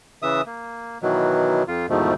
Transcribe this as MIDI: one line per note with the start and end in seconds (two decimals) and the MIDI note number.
0.22 0.41 49
0.22 0.41 52
0.22 0.41 76
0.22 0.41 87
0.46 0.98 58
1.02 1.63 47
1.02 1.63 51
1.02 1.63 52
1.02 1.63 54
1.68 1.86 41
1.68 1.86 65
1.90 2.14 40
1.90 2.14 44
1.90 2.14 47
1.90 2.14 51
1.90 2.14 53
1.90 2.14 57